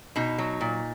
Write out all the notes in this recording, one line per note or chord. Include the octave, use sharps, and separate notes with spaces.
B2 D#4
F#3
A#2